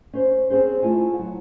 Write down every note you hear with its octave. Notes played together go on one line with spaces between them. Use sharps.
C#4 C5
C4 C#4 G#4 C5
A3 E4 F4 G#5
F#3